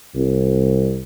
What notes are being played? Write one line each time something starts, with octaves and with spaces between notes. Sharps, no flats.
C2